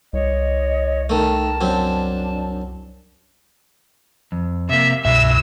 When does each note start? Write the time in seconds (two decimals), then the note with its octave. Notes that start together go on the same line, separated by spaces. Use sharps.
0.13 C2 C#5 D#5
1.10 D#3 A3 A#4 A5
1.61 F#2 C4 D4
4.32 F2
4.69 C3 A#3 E5
5.05 C2 G2 B2 E5 E6